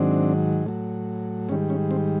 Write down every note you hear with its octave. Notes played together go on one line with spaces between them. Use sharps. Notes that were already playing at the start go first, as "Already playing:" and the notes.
Already playing: G#2 D#3 F#3 C4 D4
A2 F#3
G#2 D#3 G3 C#4
C#4
C4